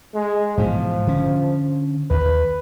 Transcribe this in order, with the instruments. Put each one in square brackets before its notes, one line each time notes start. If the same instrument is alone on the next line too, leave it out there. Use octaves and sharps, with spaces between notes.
[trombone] G#3
[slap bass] G#2 B2 E3 [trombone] F3
[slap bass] D3 C#4
[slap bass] D#2 [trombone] B4